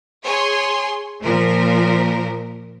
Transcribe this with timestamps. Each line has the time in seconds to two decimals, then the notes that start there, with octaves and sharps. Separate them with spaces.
0.24 G#4 C#5 G#5 C6
1.23 A#2 F3 A#4